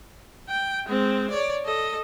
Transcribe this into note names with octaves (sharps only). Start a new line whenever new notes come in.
G5
G#3 C4
C#5 D5
A4 D#5